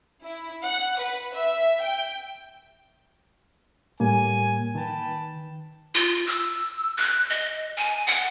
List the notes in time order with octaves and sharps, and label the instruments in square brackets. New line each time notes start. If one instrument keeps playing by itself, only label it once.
[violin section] E4
F#5
B4
E5
G5
[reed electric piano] A2 G3 A#3 [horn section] G#5
[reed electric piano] D#3 [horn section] B4 G5 A5
[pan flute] F4
E6
F#6
D#5
G#5
F#5